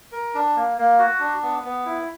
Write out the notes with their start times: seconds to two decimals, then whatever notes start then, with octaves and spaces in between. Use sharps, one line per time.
0.12 A#4
0.34 D4
0.56 A#3
0.78 A#3
0.99 F#4
1.20 D4
1.43 B3
1.64 B3
1.86 E4